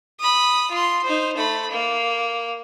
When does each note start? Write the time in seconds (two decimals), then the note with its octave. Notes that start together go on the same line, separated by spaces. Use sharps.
0.20 B5 D#6
0.71 F4 C6
1.03 D#4 C5
1.37 A3 B5
1.71 A#3